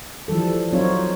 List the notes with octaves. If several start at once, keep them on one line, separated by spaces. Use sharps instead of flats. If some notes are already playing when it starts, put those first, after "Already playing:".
E3 F3 G3 A4
F#3 C4 D#4 F4 C#5